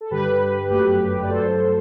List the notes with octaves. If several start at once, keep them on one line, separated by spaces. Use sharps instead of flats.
A4
G2 D3 G3 G4 B4
G1 F#2 F#3 A3 G4 B4
D5
G2 F#3 A3 A4 C5